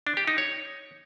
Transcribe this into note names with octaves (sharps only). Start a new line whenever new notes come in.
D4
G4
D#4
C#5